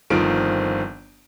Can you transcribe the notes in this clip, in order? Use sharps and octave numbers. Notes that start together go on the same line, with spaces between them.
G1 D#3 F3 C4 D7